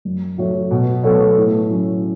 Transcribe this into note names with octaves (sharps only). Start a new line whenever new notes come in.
F#2
F#3 A3 F#4 C#5
B2
F#3 B3 A4 C#5
A2
F#3 C#4